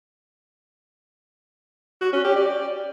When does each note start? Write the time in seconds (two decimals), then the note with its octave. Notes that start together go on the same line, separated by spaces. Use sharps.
2.01 F#4
2.13 C#4
2.24 G4
2.36 D5